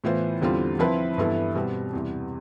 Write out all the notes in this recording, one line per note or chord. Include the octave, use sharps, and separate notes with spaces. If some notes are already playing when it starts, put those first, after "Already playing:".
A2 E3 B3 F4 C5
E2 D3 G3 C4 F4
F3 C4 E4 B4
G2 E3 B3 E4 A4
B2 G3 C4
E2 C3 G3